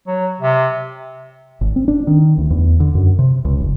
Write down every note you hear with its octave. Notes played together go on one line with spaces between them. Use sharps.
F#3
C3
G#1
C4
D4
D#3
D2
E2
D3
F#2
C3
C#2
F1